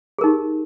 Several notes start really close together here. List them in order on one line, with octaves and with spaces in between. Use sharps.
G#4 A#4 D#4 G4